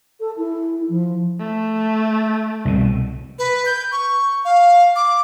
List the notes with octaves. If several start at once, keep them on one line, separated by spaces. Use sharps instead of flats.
A4
E4
F3
A3
C2 B2
B4
G6
C#6
F5
D6